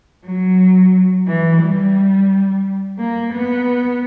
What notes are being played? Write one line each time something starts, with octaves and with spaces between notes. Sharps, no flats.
F#3
E3
G3
A#3
B3